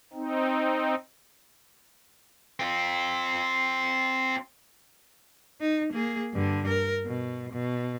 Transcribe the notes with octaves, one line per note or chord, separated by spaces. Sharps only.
C4 D#4
C4 F4
D#4
A#3 G#4
G2 D3
A#4
B2
B2